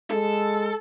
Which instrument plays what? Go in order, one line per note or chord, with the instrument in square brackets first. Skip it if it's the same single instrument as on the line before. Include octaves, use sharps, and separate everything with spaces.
[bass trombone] G#3 [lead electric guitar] A4